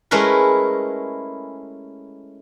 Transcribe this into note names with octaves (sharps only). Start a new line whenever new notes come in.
G#3 A3 C#4 E4 A#4 B4